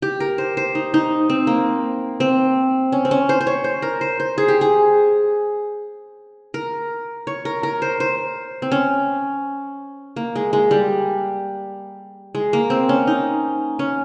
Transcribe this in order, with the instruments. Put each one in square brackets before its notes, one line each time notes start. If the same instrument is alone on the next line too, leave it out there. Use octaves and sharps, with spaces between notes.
[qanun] G4
A#4
C5
C5
D#4
D#4
C4
A#3
C4
C#4
C4
C#4
C5
C5
C#5
C5
A#4
C5
C5
G#4
G4
G#4
A#4
C#5
A#4
A#4
C5
C5
C4
C#4
A#3
G#3
G#3
G3
G#3
A#3
C4
C#4
D#4
C#4